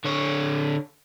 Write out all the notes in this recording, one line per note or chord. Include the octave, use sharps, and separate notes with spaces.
D3 C#5